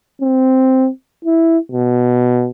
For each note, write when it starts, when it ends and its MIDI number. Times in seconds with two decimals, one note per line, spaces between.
0.22 0.89 60
1.25 1.58 64
1.72 2.49 47